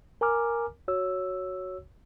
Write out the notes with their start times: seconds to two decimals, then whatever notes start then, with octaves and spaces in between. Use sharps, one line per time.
0.21 A#4 G#5 A#5 D6 F6
0.88 F#4 C#5 E6